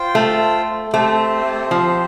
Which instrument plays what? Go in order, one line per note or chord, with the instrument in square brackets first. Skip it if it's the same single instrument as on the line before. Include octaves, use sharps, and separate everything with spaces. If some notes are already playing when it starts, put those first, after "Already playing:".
Already playing: [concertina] F4 C5 G5
[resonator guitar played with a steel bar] A3
[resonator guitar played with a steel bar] A3 [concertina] C4 G4 C5
[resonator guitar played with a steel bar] F3